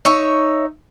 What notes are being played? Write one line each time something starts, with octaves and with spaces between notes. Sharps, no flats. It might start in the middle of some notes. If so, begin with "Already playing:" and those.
D#4 C#5 E5